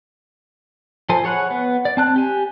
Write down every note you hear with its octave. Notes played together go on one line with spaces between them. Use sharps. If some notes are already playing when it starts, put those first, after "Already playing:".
F3 A4 C5 G#5
G#4 C#5 F#5 B5 F#6
B3
D5
C4 A5 F#6
G4 G#5